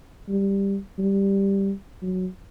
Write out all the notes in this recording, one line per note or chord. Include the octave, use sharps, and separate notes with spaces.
G3
G3
F#3